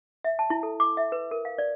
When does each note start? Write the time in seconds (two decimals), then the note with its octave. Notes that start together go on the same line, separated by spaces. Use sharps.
0.24 E5
0.39 A5
0.50 E4
0.63 A4
0.80 D6
0.97 E5
1.12 B4
1.31 A#4
1.45 F5
1.58 D5